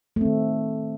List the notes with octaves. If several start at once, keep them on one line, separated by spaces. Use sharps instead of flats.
D#3 A3 C4